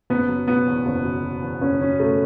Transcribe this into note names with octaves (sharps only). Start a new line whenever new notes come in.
F#1 B3
F#3
B2 B3
E2
F#1
F#3
B2
E2
F#1 C#4
F#3 C#4
B2 A3